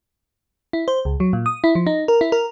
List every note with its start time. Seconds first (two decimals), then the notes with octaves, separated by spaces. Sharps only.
0.73 E4
0.88 C5
1.05 C#2
1.20 F#3
1.33 A#2
1.46 D#6
1.64 E4
1.75 F3
1.86 D#4
2.08 A#4
2.21 E4
2.32 A#4